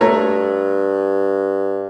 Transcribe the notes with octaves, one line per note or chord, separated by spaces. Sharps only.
G2 A3 C#5 A#5